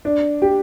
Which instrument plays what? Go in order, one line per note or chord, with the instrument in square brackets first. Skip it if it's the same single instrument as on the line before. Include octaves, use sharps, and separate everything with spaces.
[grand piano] D4
G4